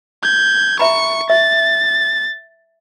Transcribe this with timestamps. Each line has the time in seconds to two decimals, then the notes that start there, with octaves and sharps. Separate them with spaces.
0.23 G6 G#6
0.79 E5 A#5 B5 C#6 C#7
1.30 E5 A6